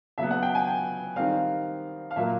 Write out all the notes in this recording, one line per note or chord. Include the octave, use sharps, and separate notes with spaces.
C#3 F#3 B3 E5
F#5
G5
G#5
G5
D#3 G3 C4 F5
F5
A#2 F#3 A#3 E5